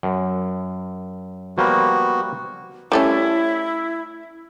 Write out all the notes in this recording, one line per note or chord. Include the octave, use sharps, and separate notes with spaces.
F#2
F3 G3 A#3 B3 F#4
G3 A3 C#4 E4